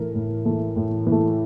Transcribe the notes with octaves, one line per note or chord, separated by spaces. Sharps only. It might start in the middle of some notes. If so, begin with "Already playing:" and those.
Already playing: A2 E3 A3 A#4
A2
E3 A3
A2
E3
A3